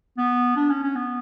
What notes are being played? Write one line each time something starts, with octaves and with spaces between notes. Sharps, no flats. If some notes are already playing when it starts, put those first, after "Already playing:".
B3
D4
C#4
C#4
B3